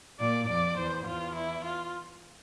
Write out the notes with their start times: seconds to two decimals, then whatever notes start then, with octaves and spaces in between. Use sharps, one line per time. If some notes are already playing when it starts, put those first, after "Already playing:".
0.20 A#2 D5
0.49 F2 D5
0.77 E2 C5
1.06 E2 F4
1.35 E4
1.64 F4